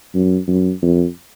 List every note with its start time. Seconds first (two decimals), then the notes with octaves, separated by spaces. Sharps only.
0.14 F#2
0.47 F#2
0.82 F2